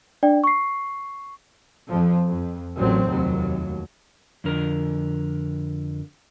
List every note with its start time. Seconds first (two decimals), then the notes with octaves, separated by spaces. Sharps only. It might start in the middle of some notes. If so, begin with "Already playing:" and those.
0.23 D4 D5 G5
0.44 C#6 C7
1.88 F2 F3
2.27 F2
2.75 A1 A#2 F#3 C4
3.07 F1 D#2 F#3
4.44 F2 D3 A#4